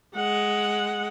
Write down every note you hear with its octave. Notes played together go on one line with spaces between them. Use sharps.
G#3 F#5